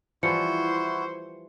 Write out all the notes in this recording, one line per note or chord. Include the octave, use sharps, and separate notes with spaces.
E3 F3 G3 E4 F#4 C5 C#7